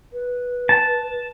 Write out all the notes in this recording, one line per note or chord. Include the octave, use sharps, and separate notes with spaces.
B4
A5